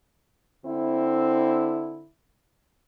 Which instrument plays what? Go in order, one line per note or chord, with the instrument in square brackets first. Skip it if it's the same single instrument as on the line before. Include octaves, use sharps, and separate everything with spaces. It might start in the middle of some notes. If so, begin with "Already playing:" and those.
[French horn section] D3 C4 E4